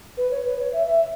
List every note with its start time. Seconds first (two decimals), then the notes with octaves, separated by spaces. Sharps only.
0.17 B4
0.31 C#5
0.45 B4
0.59 C#5
0.73 E5
0.87 E5